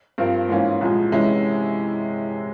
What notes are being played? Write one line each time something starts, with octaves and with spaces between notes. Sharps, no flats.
G2 F3 C4 F4 A#4
G#2 E3 A#3 C#4 F4
C2 A#2 F3 G#3
C3 E3 G#3 C#4 E4